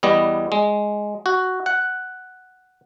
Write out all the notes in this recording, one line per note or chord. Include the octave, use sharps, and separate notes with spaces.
E2 G3 B3 D#5
G#3
F#4
F#5